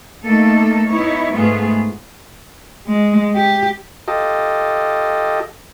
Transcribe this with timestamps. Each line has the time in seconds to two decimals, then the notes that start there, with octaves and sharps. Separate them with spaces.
0.23 A3 A#3 D#4 A4
0.89 B3 D#4 E4 C#5
1.34 G#2 A3 B3 F4 G#4
2.87 G#3
3.35 G4
4.08 F4 G4 A4 D#5